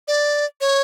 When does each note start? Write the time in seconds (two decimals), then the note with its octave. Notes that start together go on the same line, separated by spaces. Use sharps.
0.08 D5
0.61 C#5